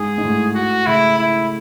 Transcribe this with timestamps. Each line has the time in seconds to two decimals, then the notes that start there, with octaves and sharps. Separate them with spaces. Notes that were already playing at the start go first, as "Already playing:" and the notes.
Already playing: G#2 G#4
0.18 G#2
0.24 A2
0.55 F#4
0.86 A2 C#3 E4
1.18 E4